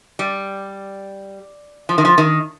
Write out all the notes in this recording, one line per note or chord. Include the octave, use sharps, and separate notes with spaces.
G3
F3
D#3
F3
D#3